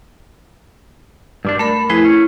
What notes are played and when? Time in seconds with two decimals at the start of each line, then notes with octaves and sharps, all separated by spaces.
1.45 G2 G3 D4
1.59 A3 A#4 A5 B5
1.90 F2 E4 G#4 B4
2.05 C#4